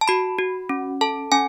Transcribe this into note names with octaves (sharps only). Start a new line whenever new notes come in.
A5
F#4 B5
F#4
C#4
A4 A5
C#4 G#5